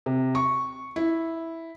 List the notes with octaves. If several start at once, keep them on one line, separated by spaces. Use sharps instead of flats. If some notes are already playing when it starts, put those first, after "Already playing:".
C3
C#6
E4